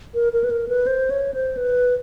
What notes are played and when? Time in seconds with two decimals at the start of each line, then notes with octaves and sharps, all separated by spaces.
0.14 A#4
0.33 A#4
0.44 B4
0.50 A#4
0.69 B4
0.87 C5
1.10 C#5
1.34 C5
1.57 B4